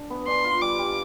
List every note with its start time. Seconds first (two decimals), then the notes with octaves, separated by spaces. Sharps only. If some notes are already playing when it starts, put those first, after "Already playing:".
Already playing: D4
0.10 B3
0.27 D4 C6
0.44 F4
0.61 G3 D6
0.78 G3